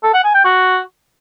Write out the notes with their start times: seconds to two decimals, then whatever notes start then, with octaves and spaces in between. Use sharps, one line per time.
0.03 A4
0.14 F#5
0.24 G#5
0.34 G5
0.45 F#4